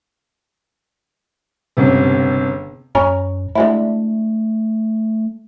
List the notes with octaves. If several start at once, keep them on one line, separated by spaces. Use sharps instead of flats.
G1 C#2 C3
F#2 C#4 G#5 A#5
D3 G#3 A3 E4